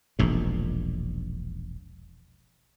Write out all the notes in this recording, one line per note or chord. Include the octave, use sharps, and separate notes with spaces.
E1 A#1 G#2